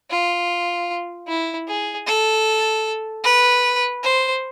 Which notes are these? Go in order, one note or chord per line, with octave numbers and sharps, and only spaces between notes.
F4
E4
G#4
A4
B4
C5